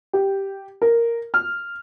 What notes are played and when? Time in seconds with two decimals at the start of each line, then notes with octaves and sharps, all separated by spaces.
0.13 G4
0.82 A#4
1.34 F6